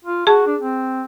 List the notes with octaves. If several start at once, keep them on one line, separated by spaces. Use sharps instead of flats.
F4
F#4 G#4 A5
D4
C4